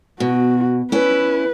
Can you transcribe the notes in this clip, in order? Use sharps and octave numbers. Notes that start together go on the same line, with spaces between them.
B2 F#4
C#4 E4 B4